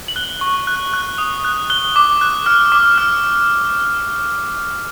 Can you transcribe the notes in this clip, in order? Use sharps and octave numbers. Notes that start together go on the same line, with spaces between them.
F#7
F#6 G7
C#6
F#6
F#6
D#6
F#6
F#6 G7
D6
F#6
F6
D6
F6